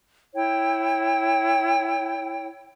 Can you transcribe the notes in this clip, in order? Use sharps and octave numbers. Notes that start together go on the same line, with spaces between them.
E4 C#5 G5